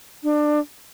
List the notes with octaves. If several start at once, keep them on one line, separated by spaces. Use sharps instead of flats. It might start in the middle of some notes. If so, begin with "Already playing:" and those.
D4